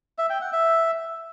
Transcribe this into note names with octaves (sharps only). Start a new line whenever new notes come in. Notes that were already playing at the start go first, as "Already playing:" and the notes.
E5
G5
F#5
E5